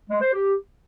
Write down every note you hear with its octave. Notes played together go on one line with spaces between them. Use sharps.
G#3
C5
G4